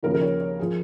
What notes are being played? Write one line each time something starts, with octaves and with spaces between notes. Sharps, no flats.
D#2 C#3 F3 A#4
A#4
C#5
C#5
F3 G#4